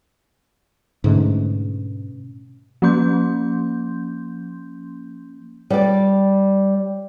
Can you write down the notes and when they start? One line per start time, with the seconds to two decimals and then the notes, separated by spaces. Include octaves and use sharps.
1.04 G#2 B2 D3 A3 C#4
2.82 F3 A#3 C#4 C6 G6
5.70 G3 D5